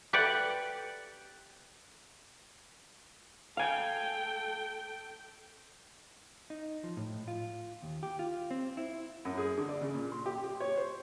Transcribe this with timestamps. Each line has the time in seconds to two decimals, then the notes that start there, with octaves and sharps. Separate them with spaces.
0.13 G4 B4 D5 F#5 G5
3.57 A4 F5 G5 G#5
6.50 D#4
6.84 F3
6.97 A2
7.28 F4
7.82 D#2
8.03 G4
8.19 F4
8.51 C4
8.77 E4
9.25 F#2
9.38 G#4
9.58 D3
9.69 D5
9.81 C#3
9.94 A#2
10.12 C6
10.26 G4
10.43 G4
10.60 C#5
10.77 C5